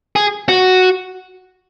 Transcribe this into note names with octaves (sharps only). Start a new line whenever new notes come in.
G#4
F#4